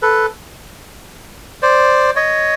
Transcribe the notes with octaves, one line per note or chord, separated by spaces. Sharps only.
A4 B4
C5 D5
C#5 D#5